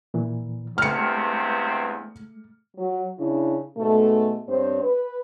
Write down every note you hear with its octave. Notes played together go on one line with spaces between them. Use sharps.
A#2 E3
E2 G2 C3 G#3 A3 F6 C#7
F#3
C#3 D4 E4
G#2 B2 A3
G2 C4 C5 C#5
B4